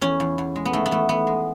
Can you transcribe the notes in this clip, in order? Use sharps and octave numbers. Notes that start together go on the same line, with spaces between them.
E2 C#4
E2
E2
G#3
B3
D#3 A3
B3
E2 A3
E2 B3
G#3